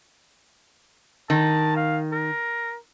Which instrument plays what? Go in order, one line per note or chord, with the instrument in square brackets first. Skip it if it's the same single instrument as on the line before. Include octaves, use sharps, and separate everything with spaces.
[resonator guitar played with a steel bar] D#3 [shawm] A5
[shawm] F5
A#4